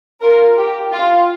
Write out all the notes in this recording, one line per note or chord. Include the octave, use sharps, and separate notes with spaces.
F4 A#4
G4
F4